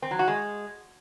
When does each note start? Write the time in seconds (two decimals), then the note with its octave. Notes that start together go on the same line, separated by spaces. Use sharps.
0.02 C4
0.11 F#3
0.19 F#4
0.28 G#3